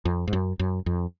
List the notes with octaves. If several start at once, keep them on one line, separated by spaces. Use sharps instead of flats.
F2
G#2
F#2
F#2
F2